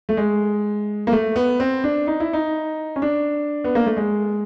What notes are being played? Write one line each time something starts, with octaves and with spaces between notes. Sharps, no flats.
A3
G#3
A#3
A3
B3
C4
D4
D#4
E4
D#4
C#4
D4
B3
A#3
A3
G#3